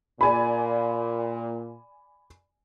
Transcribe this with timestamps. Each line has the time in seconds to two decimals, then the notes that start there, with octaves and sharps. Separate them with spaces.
0.21 A#2 D5 G#5 B5